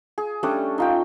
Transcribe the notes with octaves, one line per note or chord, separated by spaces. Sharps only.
G#4
G3 A3 C#4 D4
D#4 F4 G5